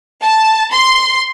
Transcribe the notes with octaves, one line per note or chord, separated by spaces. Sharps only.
A5
C6